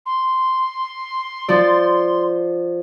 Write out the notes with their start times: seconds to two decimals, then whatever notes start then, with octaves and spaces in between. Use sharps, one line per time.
0.06 C6
1.48 F3 D5